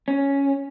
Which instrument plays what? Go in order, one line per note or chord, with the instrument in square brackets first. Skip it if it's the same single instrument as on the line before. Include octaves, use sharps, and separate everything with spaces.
[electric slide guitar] C#4